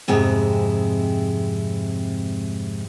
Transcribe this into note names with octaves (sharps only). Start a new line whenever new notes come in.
F2 G#2 C3 G#3 E4